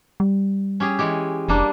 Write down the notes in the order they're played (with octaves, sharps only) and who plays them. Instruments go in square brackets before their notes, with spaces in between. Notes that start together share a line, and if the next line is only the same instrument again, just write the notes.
[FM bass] G3
[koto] C#4 G4 G#4
E3 G#3 G4
[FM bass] F1 [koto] G3 A#3 D4